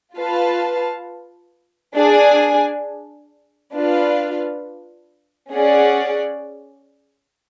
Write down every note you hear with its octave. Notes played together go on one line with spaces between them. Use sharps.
F4 B4 F5 A5
D4 G#4 D5 G#5
D4 F4 B4 F5
C#4 G#4 D5 F#5